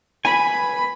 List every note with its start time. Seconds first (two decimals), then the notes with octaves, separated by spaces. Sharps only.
0.25 B4 G#5 B5